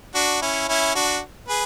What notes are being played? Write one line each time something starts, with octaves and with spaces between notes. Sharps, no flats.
D4 F#4
C#4 E4
C#4 E4
D4 F#4
G#4 B4